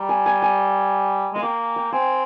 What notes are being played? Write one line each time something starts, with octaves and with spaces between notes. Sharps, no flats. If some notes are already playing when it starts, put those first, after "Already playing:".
Already playing: G3 A#5
G#5
G#5
G#5
G#3 F5
A#3 G5
G5
C4 G#5